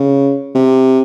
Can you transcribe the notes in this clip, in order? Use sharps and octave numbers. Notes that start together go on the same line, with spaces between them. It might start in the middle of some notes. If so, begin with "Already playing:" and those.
Already playing: C#3
C3